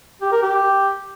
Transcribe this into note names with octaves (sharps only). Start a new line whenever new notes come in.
G4
A#4
G4